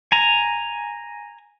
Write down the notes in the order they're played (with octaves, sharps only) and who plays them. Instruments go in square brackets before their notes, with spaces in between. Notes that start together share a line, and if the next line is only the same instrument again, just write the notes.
[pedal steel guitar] G#5 A#5